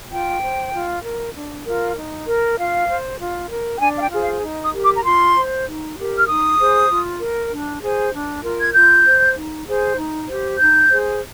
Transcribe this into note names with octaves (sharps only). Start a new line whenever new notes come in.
F4 G5
C5
F4
A#4
D4
F4 A#4
D#4
A#4
F4 F5
C5
F4
A#4
G5
D4 G#5
F5
G5
F4 G#4 C5
F5
D#4
D#6
G4 A#4
D6
A#5
F4 C6
C5
D#4
G4 A#4
F6
D#4 D#6
G#4 C5
F4
A#4
D4
G#4 C5
D4
F4 A#4
G#6
F4 G6
C5
D#4
G#4 C5
D#4
G4 C5
D#4 G6
G#4 C5